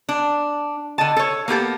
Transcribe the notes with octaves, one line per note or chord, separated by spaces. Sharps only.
D4
D3 D#5 A5
A4 C#5
A#3 B3 G4 A4